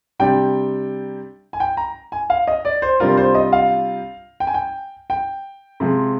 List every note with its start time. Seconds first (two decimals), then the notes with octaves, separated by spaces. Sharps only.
0.20 C3 G3 D4 G5
1.53 G#5
1.60 G5
1.77 A#5
2.12 G#5
2.30 F5
2.47 D#5
2.65 D5
2.82 C5
3.00 C3 G3 D4 F4 A#4
3.17 C5
3.35 D#5
3.53 F5
4.40 G5
4.47 G#5
4.54 G5
5.10 G5
5.80 C3 F3 G#3